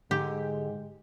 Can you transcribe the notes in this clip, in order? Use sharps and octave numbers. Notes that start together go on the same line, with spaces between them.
G#2 D3 G#3 G4